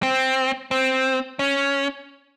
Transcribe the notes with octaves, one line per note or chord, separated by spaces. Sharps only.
C4
C4
C#4